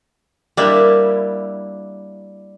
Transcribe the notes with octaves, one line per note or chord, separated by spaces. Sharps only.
G3 A#3 D4 E4